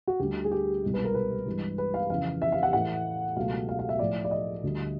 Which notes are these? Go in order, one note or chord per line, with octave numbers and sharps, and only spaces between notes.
F#4
D2 D3 G3 G4
G#4
G4
C2 B2 G#3
B4
A#4
B4
G2 E3 G#3
B4
F5
F2 C#3 E3 F5
E5
F5
F#5
A2 E3 A3 F#5
C#2 B2 F#3 A3 F5
F5
F5
E5
A2 F3 A3 D5
D5
D#5
D2 D3 G3